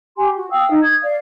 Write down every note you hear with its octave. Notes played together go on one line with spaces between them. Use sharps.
G4 G#5 C6
F#4
F5 G5 D#6 E6
D#4
D#6 G#6
D5 F5